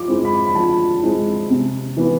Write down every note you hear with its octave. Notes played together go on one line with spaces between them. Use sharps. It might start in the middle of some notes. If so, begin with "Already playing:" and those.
Already playing: F3 D6
G#3 C4 E4
B5
B5
F3 A5
G#3 C4 E4
C3
E3 B3